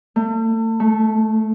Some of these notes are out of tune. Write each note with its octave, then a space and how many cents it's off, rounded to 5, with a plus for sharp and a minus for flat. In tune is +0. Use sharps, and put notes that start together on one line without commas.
A3 +35
A3 -10